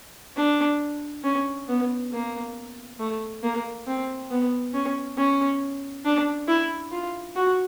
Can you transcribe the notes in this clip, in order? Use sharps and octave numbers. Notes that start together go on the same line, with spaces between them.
D4
C#4
B3
A#3
A3
A#3
C4
B3
C#4
C#4
D4
E4
F4
F#4